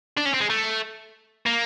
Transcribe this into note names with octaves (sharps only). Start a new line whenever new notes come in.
D4
C#4
C4
G#3
A3
A#3